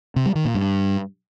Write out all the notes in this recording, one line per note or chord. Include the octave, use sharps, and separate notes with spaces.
C3
G3
D#3
A#2
G2